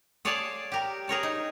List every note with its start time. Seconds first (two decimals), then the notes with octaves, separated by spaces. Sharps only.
0.25 G#4 C#5 D5 F5 G#5 A5
0.72 G4 A#4
1.08 G#4 A#4 C#5 A5
1.23 D#4